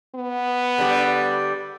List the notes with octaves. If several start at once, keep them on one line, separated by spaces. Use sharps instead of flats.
B3
D3 G3